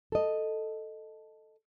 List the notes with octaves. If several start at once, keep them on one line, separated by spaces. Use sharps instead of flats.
A4 D#5